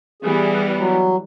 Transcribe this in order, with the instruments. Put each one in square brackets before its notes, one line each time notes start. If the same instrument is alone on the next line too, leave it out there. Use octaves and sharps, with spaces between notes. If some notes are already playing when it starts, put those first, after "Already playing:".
[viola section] E3 G3 B3 [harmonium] G#4
[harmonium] F#3